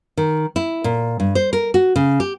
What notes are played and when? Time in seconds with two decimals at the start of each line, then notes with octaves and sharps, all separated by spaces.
0.17 D#3
0.56 E4
0.84 A#2
1.20 G2
1.35 C5
1.53 A#4
1.74 F#4
1.96 C#3
2.20 G4